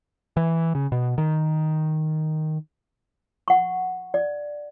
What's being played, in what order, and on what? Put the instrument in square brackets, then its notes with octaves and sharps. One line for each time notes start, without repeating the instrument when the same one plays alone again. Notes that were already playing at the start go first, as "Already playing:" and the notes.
[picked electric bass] E3
C#3
B2
D#3
[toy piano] F#5 C#6
D5